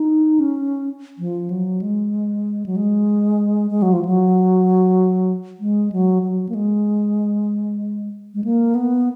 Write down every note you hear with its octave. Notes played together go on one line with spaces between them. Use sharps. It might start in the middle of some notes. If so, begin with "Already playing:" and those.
Already playing: D#4
C#4
F3
F#3
G#3
F#3
G#3
G#3
F#3
F3
F#3
G#3
F#3
F#3
A#3
G#3
G#3
A#3
B3